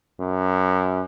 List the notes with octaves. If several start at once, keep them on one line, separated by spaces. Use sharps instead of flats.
F#2